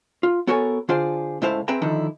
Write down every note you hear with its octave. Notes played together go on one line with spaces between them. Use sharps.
F4
B3 F#4 A4 A#4 C#5 G#5
D3 D4 F4 G#4 C5 D5
C#2 A2 E4 C5 F5 A5
C4 G#4 B4 E5 G5 A#5
D3 D#3 F3 D#4 E4